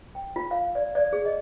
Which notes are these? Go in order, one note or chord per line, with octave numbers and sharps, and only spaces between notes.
G5
F4
F5
D5
D5
G#4
D#5